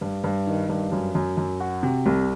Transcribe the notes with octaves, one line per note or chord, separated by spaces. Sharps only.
G2
G2
D#3
G2
F#2
F#2
F#2
F#4
C3
C2